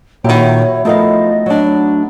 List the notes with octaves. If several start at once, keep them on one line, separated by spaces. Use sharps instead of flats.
A#2 D#3 F#3 E4 F#4 G4 C#5
F3 A3 B3 D#4 A4 A#4 D#5 F5
F#3 D4